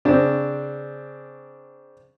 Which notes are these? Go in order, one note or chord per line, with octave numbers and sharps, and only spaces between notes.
C#3 C4 D4